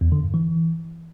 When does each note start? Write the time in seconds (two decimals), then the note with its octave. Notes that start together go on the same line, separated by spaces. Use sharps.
0.01 E2
0.12 D3
0.23 G2
0.34 E3